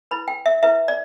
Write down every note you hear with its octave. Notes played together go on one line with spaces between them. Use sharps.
E4 B4 B5
G5
E5
E4 B4 E5
D5